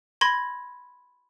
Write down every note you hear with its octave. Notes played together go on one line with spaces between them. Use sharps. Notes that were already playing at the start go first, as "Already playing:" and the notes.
B5 C6 G#6 A#6